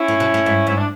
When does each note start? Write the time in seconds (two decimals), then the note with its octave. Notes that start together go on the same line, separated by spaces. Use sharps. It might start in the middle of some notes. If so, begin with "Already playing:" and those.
Already playing: C#4 E4
0.08 A2
0.20 B2
0.34 A2
0.46 G#2
0.67 G#2 E4
0.77 D4